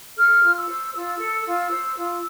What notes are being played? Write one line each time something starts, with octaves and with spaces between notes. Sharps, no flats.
A4 F6
F4
E6
C5
F4 E6
A4
F4
C5
F4